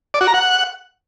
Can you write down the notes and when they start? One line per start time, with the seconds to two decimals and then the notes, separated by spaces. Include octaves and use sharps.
0.14 D5
0.21 F#4
0.27 A#5
0.34 F#5